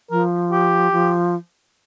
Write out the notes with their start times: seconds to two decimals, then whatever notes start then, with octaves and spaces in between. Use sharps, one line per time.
0.11 F3 A#4
0.51 G4
0.92 F3